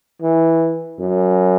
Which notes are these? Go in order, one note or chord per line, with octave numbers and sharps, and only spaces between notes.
E3
F#2